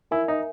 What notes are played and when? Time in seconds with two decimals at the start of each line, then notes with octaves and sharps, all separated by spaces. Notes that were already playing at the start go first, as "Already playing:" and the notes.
0.11 E4 A#4 E5 G#5
0.28 D#4